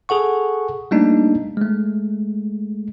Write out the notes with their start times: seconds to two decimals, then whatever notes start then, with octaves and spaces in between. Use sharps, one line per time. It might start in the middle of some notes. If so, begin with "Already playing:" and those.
0.09 G#4 A4 F#5 C#6
0.91 G3 A3 A#3 D4 D#4
1.57 G#3 A3